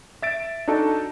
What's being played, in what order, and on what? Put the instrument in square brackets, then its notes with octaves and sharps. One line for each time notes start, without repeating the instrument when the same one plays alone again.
[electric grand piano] E5 A6 D7
D4 D#4 F#4 A4